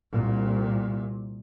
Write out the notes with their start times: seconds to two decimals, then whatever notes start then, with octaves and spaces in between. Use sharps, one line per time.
0.12 C2 A#2